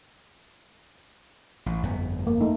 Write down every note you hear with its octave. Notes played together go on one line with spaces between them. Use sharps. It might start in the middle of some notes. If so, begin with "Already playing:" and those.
A1
G1 F2 B3
A#3
A3 D#4